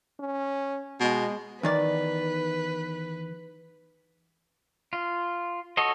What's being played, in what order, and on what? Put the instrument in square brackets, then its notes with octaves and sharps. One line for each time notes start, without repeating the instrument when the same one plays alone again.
[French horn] C#4
[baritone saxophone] B2 [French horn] G#3
[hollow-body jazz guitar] E2 D#3 D5 [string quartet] B4
[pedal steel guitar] F4
F#4 A4 C#5 D#5